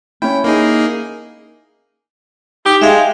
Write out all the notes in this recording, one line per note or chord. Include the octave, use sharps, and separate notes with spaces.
C#4 E4 G5
A#3 D#4 G#4
D#4 G4
G#3 E5 F5 G5